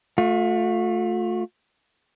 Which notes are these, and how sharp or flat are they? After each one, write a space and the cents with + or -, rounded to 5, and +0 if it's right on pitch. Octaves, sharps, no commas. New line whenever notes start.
A3 +0 F4 +40